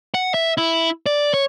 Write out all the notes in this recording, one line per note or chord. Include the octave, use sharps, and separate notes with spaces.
F#5
E5
E4
D5
C#5